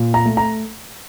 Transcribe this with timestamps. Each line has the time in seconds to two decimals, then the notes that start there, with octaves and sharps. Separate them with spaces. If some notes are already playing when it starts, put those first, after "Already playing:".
Already playing: A#2
0.14 A#5
0.26 A3
0.37 A#5